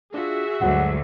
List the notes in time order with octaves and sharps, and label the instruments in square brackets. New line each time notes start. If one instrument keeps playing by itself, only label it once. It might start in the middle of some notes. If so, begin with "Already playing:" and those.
[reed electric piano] D4 F4 [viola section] F#4 G#4 E5
[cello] D2 [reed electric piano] G2 F#3 G#3 [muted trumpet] F#5